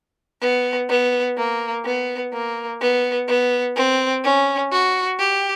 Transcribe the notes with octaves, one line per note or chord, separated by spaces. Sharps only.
B3
B3
A#3
B3
A#3
B3
B3
C4
C#4
F#4
G4